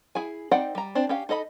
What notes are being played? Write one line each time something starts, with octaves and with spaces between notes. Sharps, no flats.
E4 G#4 G#5
C4 D#4 D5 F#5 G5
G3 A#5
C4 D4 C5
C#4 G4 F5
D#4 A4 D#5 B5